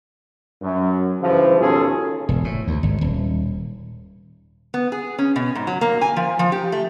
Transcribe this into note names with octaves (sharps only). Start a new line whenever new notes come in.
F#2
G2 C#3 E3 F3
D#2 B2 C#4 F4 G#4 A4
E1
A2
D2
G#1
D#1
B3
G#4
C#4
B2
G#2
F#3
A#3
G#5
F3
F3
G4
A3